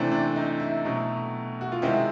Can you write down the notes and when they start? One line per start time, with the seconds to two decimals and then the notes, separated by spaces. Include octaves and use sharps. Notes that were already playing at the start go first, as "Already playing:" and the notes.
Already playing: C3 E3 A3 C4 D4
0.12 D4
0.36 D#4
0.60 E4
0.85 B2 F#3 A3
1.61 F#4
1.72 F4
1.82 C3 D#3 G#3 C4 E4